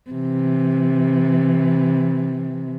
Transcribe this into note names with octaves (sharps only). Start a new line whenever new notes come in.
C3 E3